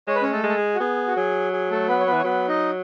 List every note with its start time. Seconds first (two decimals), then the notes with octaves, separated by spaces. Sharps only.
0.07 G#3 C#5
0.16 B4
0.22 C#4 C#5
0.31 A3 A4
0.43 G#3
0.49 A4
0.56 G#4
0.75 F#4
0.80 B3 G#4
1.07 F#4
1.16 F#3 G#4
1.53 G#4
1.71 A3 A4
1.88 B3 B4
2.00 C#5
2.06 B3 B4
2.13 E3
2.19 C#5
2.24 F#3 B3 B4
2.48 D#4 D#5